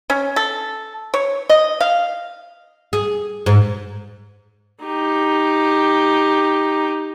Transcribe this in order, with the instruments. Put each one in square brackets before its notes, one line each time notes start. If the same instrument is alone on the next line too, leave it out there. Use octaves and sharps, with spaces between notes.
[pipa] C#4
A4
C#5
D#5
F5
[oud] G#4
G#2
[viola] D#4 G4